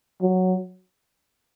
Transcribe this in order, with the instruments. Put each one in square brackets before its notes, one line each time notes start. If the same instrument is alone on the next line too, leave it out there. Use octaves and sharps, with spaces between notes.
[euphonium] F#3